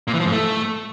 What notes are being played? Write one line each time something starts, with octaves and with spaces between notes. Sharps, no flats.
A#2
E3
F3
G#2
A3